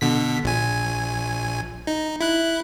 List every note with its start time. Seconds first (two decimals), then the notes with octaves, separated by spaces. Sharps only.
0.01 B2 D3 B6
0.44 A#1 G#5
1.87 D#4
2.21 E4 F#6